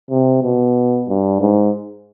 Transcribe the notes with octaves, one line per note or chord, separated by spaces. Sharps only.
C3
B2
G2
G#2